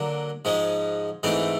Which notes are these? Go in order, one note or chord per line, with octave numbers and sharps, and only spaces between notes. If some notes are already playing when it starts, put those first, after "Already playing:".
Already playing: D3 F#3 A#3 D4
G#2 F3 G#3
G#2 E3 A3 C4